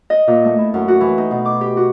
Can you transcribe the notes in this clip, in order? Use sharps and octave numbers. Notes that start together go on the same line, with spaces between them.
D#5
A#2
A3
E4
F#2
F#4
E3
D#4
B2
D6
G4
F#4